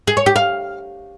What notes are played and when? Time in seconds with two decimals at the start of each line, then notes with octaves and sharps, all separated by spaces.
0.07 G#4
0.17 C#5
0.26 G4
0.36 F5